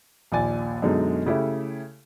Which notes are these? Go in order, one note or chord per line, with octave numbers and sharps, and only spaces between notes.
A#1 D#2 D5 G#5 A6
F#2 B2 D3 G#3 D#4
C#3 A3 E4 G4